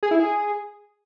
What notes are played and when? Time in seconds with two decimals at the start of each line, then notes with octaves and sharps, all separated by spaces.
0.03 G#4
0.11 E4
0.20 G#4